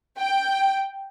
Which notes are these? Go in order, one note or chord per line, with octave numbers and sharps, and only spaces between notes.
G5